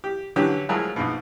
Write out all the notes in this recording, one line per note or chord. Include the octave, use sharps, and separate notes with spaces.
G4
D3 E3 F#3 C#4 G4
F3 F#3 G#3 A3 E4 A#4
A#1 G#2 B2